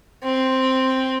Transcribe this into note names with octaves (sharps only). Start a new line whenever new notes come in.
C4